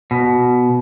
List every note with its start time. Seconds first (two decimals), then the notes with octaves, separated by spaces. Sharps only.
0.11 B2